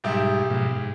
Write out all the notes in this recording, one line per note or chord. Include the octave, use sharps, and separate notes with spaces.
B1 G#2 G3 G4 E5
G#2 B2 F3
G#2